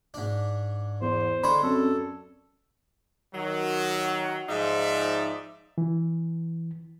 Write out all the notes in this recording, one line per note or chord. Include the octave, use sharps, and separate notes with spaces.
G#2 D4
E2 C5
D3 G#3 C#5 D5 B5 C6
F#2 C4 A4
D#3 F#3
G#2 F3 D#4 D5 E5
E3